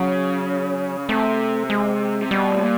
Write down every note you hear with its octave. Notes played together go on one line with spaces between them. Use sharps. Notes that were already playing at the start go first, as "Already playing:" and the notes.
Already playing: C#3 F#3
C3 A3
G#3
C3
B2 G3
A2
A#2